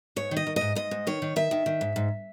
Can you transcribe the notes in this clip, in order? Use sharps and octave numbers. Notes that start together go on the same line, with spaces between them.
G#2 C#5
D#3
D#5
D#3
G#2 D#5
G#2 D#5
G#2
D#3 C#5
D#3
D#3 E5
D#3
D#3
G#2
G#2